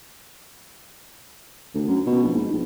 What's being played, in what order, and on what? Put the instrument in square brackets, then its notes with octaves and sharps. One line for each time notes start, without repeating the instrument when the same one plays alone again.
[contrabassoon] D2
F#2
B2
A#1
G#2
A#1